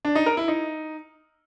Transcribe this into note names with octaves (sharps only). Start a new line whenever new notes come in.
D4
D#4
A#4
E4
D#4